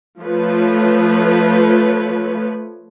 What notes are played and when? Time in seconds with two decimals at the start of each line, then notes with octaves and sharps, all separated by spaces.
0.22 F3 A3 B4 C#5